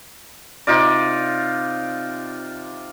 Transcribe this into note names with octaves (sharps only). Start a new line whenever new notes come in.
C3 D#4 F4 D5